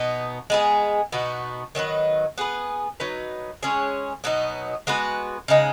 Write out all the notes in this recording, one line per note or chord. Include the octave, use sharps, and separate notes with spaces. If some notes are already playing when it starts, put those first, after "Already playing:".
Already playing: B2 B3 D#4
G#3 B3 G#4
B2 B3 D#4 F#4
D#3 F#3 D#4 B4
B3 G#4 B4
F#3 D#4 B4
G#3 C#4 G#4 C#5
B2 F#3 B3 D#4
G#3 B3 F#4 B4
C#3 G#3 D#4